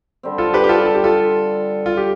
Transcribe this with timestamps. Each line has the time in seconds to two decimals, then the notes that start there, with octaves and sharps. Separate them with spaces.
0.23 D3 G3 C4
0.38 F4 A4
0.54 G4 B4
0.64 G4
0.69 F4 A4
0.86 A4
0.95 G4
1.04 F4 A4
1.86 F4
1.97 G4